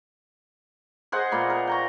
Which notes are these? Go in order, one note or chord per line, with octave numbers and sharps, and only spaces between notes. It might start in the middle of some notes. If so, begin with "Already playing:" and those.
G#4 C5 D#5 F#5
A#2 A#3 B3
A#4
G5 A#5 C#6